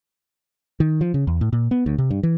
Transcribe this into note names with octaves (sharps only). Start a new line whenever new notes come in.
D#3
F3
C#3
E2
A2
A#2
B3
D2
C3
G2
E3